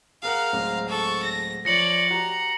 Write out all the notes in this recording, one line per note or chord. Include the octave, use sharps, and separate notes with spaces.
G#4 A#4 F5 F#5 A#5
D1 G#3 C4
A4 C#6
A#6
F3 C#5 D5 A#6 C#7 F#7
F#4 G4 A#5